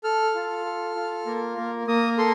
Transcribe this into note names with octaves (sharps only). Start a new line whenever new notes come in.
A4 F6
F4
A4
F4
A#3
A#3
A#3 D#6
A4 C6